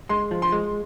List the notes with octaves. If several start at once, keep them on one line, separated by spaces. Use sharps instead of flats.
G#3 C6
F3
C6
G#3